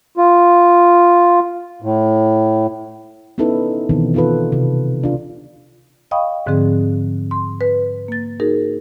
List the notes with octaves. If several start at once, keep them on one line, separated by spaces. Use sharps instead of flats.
F4
A2
B3 C#4 D#4 E4 A4 B4
B2 D#3 E3 B3 C4
B3 D#4 F4 A4 B4
C3
D4 F4
D#5 F5 G5 B5 C#6 D#6
G#2 D3 F3 C4 G#4
C6
B4
A#3 A6
D#4 F#4 G#4 A#4